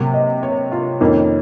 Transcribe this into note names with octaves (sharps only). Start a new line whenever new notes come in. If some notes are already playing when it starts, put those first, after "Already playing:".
Already playing: C3 F#3 A#3
D#5
C#5
F4
F2 D#3 A#3 C#4